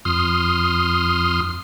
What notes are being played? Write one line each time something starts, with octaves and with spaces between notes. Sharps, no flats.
F2 C6 D#6 F6